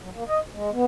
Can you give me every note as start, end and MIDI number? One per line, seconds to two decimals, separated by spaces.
0.02 0.10 54
0.14 0.24 58
0.29 0.40 75
0.40 0.49 38
0.53 0.70 56
0.73 0.85 59